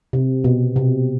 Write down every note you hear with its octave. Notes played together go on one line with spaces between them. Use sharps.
C3
B2
C3